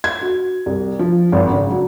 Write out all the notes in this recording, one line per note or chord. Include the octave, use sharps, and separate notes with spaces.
G#6
F#4
C2
F3
G#1
C#3
F#3